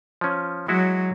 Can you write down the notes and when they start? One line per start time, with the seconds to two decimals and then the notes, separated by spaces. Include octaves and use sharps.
0.21 F3 C#4
0.68 F#3 G#3 E4 F#4